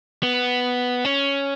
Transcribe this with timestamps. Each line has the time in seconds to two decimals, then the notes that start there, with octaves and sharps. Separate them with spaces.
0.23 B3
1.05 C#4